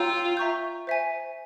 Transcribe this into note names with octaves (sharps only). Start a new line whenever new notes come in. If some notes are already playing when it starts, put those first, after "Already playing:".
Already playing: F4 C#5 G5 A#5 E6 G6
E5 A#5 C#6 G6
C5 E5 G#5